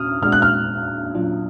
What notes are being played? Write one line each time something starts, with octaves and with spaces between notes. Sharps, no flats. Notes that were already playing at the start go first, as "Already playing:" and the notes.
Already playing: A#2 D4 F#4 D#6 F6
A#2 G#3 D4 F#4 F6
F#6
F6
A#2 F#3 D4 F4